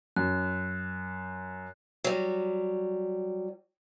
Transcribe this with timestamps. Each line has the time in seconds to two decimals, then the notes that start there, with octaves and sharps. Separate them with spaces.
0.16 F#2 F#6
2.04 F#3 G3